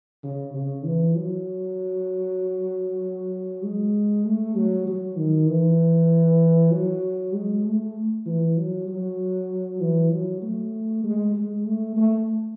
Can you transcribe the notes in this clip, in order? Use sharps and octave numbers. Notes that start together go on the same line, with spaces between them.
C#3
C#3
E3
F#3
G#3
A3
F#3
F#3
D#3
E3
F#3
G#3
A3
E3
F#3
F#3
E3
F#3
A3
G#3
G#3
A3
A3